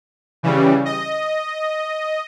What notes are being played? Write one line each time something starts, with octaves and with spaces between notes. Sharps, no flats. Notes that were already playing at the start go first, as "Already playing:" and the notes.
C#3 E3 G3
D#5